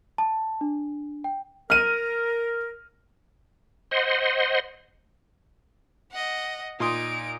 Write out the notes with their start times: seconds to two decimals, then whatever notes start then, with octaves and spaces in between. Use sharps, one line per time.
0.18 A5
0.61 D4
1.24 G5
1.70 A#4 F6 D#7
3.91 C5 D#5 F#5 C6
6.11 D#5 F#5
6.80 A#2 D#4 C6 D#6 D7